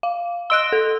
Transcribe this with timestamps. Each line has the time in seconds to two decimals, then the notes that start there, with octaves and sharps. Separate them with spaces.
0.03 F5
0.50 D#5 C6 E6 F#6 D7 G7
0.72 A4